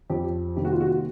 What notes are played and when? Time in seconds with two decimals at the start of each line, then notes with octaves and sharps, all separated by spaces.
0.10 F2 G4
0.56 C3 D#3 G3 A#3 G4
0.65 F#4
0.73 F4
0.80 F#4